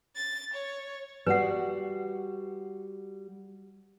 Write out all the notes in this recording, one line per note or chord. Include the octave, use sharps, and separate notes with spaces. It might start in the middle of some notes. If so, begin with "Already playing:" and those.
A6
C#5
G3 F#4 B4 F#5